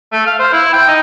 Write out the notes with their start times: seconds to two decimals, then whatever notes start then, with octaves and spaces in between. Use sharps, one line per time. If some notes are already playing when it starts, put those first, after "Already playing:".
0.12 A3
0.26 F5
0.39 C5
0.52 E4
0.73 G5
0.88 D#4